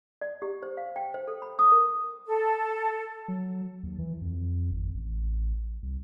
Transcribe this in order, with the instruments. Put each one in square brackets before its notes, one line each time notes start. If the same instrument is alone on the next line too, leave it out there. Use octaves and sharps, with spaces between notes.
[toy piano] D5
G4
C5
F5
G5
C5
A4
B5
D#6
A#4
[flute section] A4
[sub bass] F#3
D#2
E3
F2
G#1
A1
C2